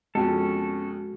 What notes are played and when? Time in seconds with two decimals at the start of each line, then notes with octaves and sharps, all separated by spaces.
0.15 F2 B2 F3 G#3 C#4 F#4 A4